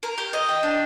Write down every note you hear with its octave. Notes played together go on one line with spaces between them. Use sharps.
A#4
G4
D#5
G5
D4